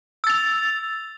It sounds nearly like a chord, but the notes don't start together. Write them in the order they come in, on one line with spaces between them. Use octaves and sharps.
E6 A6 F7